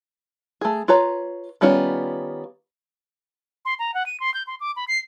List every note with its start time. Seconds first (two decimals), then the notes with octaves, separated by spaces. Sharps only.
0.61 A3 G#4
0.88 F4 B4 C#5 A#5
1.61 D#3 G3 B3 C#4 F4
3.65 C6
3.79 A#5
3.94 F#5
4.06 D#7
4.20 C6
4.34 G6
4.47 C6
4.61 D6
4.76 B5
4.88 C7